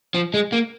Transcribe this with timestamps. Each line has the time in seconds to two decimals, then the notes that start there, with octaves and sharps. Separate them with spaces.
0.15 F3
0.34 G#3
0.52 A#3